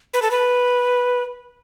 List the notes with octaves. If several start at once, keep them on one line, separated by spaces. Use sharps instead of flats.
B4
A4
B4